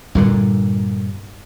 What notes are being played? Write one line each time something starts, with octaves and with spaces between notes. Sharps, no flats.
G2 A#2 D3